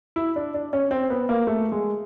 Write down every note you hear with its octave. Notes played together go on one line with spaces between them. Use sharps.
E4
D4
D4
C#4
C4
B3
A#3
A3
G#3